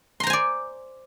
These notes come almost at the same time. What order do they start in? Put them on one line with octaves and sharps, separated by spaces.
C6 A#5 C5 G#5 D5